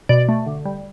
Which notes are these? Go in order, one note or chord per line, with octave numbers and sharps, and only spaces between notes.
B2 D5
A3
D3
G3